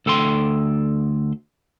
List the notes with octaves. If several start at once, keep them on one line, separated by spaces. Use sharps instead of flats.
D2 A4 G5 C6